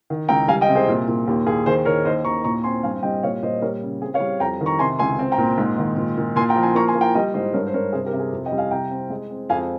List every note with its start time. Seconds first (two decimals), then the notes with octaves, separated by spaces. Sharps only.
0.10 D#3
0.29 C#2 G5 A#5
0.48 G3 F5 G#5
0.61 D#5 G5
0.68 C3
0.75 G#4 C5
0.88 A#2
1.08 A#2
1.27 D#2 G4
1.46 D#2 G#4
1.66 D#3 G#4 C5
1.85 D#3 A#4 C#5
2.05 D#2 C5 D#5
2.24 D#2 A#5 C#6
2.44 A#2 A#5 C#6
2.64 C4 G#5 C6
2.83 G2 F5 G#5
3.03 G3 D#5 G5
3.23 A#2 C#5 F5
3.42 A#2 C5 D#5
3.62 G3 A#4 C#5
3.82 C#3
4.01 C4 G#4
4.14 C#5 F5
4.20 G3
4.40 F2 G5 A#5
4.61 D#3
4.66 A#5 C#6
4.79 C3 G#5 C6
4.99 C#2 G#5 C6
5.19 C4
5.32 G5 A#5
5.38 A#2
5.58 G#2
5.78 D#3
5.97 A#2
6.17 A#2
6.36 A#2 G#5 C6
6.49 G5 A#5
6.56 F3
6.62 G#5 C6
6.75 A#3 A#5 C#6
6.88 G#5 C6
6.95 A#3
7.01 G5 A#5
7.15 G3 D#5 G5
7.34 G#2 C5 D#5
7.54 G2 A#4 C#5
7.67 C5
7.74 G2 A#4 C#5
7.92 C3 G#4 C5
8.06 G4 A#4
8.13 C3
8.19 G#4
8.32 F2
8.46 D#5 G5
8.52 G3
8.58 F5 G#5
8.71 C3 G5 A#5
8.91 C4
9.10 G#3
9.31 C4
9.50 F2 F5 G#5